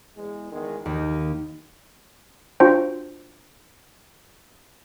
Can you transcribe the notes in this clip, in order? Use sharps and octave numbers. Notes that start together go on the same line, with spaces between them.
E2 G#3
E2 D#3 G#3
D#2 D#4
D4 F4 F#4 C5 G5